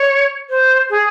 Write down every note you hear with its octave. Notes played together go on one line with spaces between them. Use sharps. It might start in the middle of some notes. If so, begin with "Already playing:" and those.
Already playing: C#5
C5
G#4